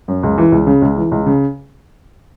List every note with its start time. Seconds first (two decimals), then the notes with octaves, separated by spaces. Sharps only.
0.08 F#2
0.23 C#2
0.38 E3
0.52 C#2
0.67 C#3
0.82 C#2
0.97 E3
1.12 C#2
1.26 C#3